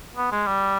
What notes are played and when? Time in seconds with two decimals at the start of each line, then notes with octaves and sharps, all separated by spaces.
0.16 B3
0.32 G#3
0.47 G3